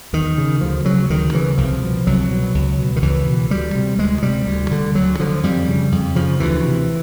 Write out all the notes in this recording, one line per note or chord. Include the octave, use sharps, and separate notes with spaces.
E2 D#3
C#3
D2 F3
C#3 F#3
D2 D#3
C#3 E3
C2 F3
B2
C2 F#3
B2
C#2
B2
D#3
C#2 E3
B2
D2 G3
C3
D2 G#3
C3 G3
D2
D3
D2 F#3
D3 F3
F2 G3
C#3
F2
C#3 F3
D2 E3
C3